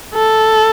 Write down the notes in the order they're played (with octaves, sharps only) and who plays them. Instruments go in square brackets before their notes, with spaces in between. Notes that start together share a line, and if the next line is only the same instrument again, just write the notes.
[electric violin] A4